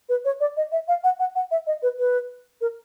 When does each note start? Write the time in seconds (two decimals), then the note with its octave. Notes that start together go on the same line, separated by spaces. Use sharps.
0.09 B4
0.25 C#5
0.40 D5
0.57 D#5
0.72 E5
0.88 F5
1.04 F#5
1.19 F#5
1.35 F#5
1.51 E5
1.67 D#5
1.83 B4
1.99 B4
2.61 A#4